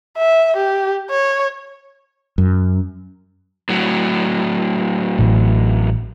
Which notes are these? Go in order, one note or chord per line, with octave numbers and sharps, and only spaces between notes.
E5
G4
C#5
F#2
A2 F#3
A1